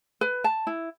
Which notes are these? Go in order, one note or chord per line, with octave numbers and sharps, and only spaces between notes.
B4
A5
E4